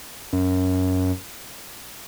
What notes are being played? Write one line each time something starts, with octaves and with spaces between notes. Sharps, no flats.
F#2